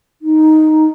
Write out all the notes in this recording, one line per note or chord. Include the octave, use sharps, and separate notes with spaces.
D#4